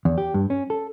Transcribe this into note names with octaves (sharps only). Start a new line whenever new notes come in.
E2
G4
G2
C#4
A4